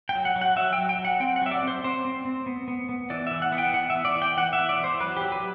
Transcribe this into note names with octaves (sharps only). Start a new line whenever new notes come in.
G5
F#3
F#5
F#3
F#5
F#3 E5
G5
F#3
G5
F#3
F#5
C4 G5
F#5
F#3 E5
D5
C4
C5
C4 C5
C4
C4
B3
B3
B3
E3 D5
E3 E5
F#5
B3
G5
E3 F#5
E5
B3
D5
E3
G5
E3 F#5
E5
B3
D5
E3 C5
F#3 B4
F#3 G4
B4